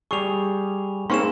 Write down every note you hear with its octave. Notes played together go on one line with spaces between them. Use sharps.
G3 G#4 C#6 F7
A#3 C4 C#4 D#4 G#4 C6 C#6 E7